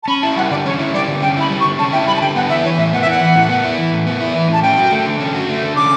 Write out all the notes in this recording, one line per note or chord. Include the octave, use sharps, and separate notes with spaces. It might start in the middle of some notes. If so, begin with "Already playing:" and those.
A5
C#4 B5
E4 A5
G3 F#5
D3 D5
C#4 C#5
E4
G3 D5
D3
C#4 G5
E4 B5
G3
C#6
D3
C#4 A5
E4 G5
G3 B5
A5
D3 G5
B3 F#5
E4 E5
E3 C#5
A2 E5
B3 F#5
E5
E4 F#5
E3
A2
B3
E4
E3
A2
B3
E4
E3
A2 A5
C#4 G5
F#4
A3
D3
C#4
F#4
A3
D3
C#4 D6